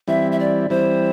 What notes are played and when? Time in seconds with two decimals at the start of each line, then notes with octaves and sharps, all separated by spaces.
0.08 E3 G3 C4 E4 E5
0.32 E5
0.39 D5
0.70 E3 G3 C4 E4 C5